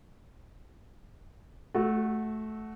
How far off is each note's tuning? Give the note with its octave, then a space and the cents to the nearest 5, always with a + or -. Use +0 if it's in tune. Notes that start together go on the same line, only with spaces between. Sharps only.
A3 -15 F#4 +0